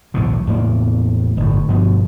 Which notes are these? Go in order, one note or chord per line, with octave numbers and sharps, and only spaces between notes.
B1 E2 A2 C3
E2 A2 A#3
G1 A2
G2 B2 F3 F#3